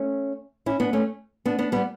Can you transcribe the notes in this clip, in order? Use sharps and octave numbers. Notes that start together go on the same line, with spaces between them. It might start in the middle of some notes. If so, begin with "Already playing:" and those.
Already playing: A3 C#4
C#4 E4
B3 D4
A3 C#4
B3 D4
B3 D4
G3 B3